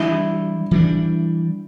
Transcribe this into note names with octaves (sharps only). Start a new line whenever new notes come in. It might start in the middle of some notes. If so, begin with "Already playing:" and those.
Already playing: E3 G3 D4 E4
E3 G3 D4